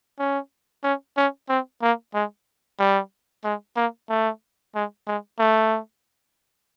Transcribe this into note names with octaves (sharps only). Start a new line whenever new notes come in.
C#4
C#4
C#4
C4
A#3
G#3
G3
G#3
A#3
A3
G#3
G#3
A3